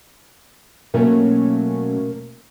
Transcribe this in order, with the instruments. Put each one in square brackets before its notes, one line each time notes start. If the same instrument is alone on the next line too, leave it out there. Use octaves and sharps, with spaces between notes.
[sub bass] B2 [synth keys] F#3 A3 C#4 [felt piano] A#3